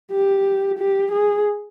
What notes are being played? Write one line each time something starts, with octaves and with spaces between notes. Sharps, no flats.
G4
G4
G#4